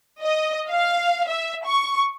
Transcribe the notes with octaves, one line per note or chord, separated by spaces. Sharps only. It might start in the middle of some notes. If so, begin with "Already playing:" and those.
D#5
F5
E5
C#6